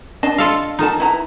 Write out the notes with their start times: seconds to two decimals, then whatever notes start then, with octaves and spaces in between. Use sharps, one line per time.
0.23 D4 D#5 A5
0.38 F4 A4 F5
0.79 D#4 F4 A4 A5
1.00 E4 B4 A#5